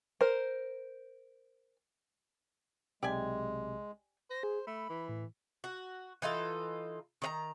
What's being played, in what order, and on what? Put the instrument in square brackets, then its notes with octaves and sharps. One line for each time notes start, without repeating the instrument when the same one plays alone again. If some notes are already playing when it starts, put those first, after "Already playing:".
[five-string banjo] A#4 C5
[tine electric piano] B1 C3 [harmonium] G#3 [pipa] G4 D5 G#5
[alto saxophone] C5 [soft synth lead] A#6
[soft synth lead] G#4
[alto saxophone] A3 [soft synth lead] B5
[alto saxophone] E3
[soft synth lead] A2
[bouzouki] F#4
E3 D#4 F4 A4
D#3 D5 A#5